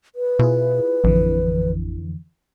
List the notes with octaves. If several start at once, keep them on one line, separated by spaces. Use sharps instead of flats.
B4
B2 E4 F4 G#4
A1 F2 D3 E3